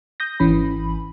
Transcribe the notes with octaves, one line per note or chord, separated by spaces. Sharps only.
D#6 G6 A#6
G#1 E3 C#4 B5